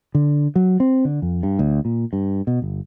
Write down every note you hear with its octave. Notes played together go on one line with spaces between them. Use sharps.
D3
F#3
C4
D3
F2
G2
D2
A#2
G2
B2
G1